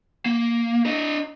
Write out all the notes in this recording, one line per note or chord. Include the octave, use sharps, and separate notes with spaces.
A#3
D4 D#5